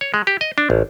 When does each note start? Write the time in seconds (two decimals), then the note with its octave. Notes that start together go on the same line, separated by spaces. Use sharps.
0.01 C#5
0.14 G#3
0.27 G4
0.41 D#5
0.58 D4
0.70 A1